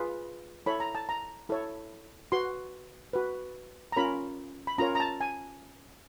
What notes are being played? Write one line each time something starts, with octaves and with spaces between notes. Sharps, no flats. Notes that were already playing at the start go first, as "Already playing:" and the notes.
Already playing: F4 G#4 B4
E4 A4 C#5 B5
A#5
A5
A#5
E4 A4 C#5
F#4 B4 C6
F#4 B4
A#5
C#4 F4 A#4 C#5 B5
B5
C#4 F4 A#4 C#5 A#5
A#5
A5
G#5